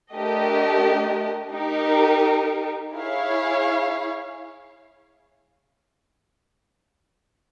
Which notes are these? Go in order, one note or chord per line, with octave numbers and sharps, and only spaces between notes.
A3 D4 G4 A#4 D#5
D#4 G4 A#4
E4 G#4 C#5 F5